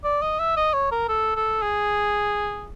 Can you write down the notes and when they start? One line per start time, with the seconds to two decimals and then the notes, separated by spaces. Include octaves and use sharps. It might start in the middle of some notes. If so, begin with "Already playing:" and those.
0.04 D5
0.22 D#5
0.39 E5
0.57 D#5
0.74 C#5
0.92 A#4
1.08 A4
1.36 A4
1.62 G#4